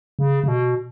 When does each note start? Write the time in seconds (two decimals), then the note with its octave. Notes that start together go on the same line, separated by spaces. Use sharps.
0.19 C#3
0.44 C#3
0.48 B2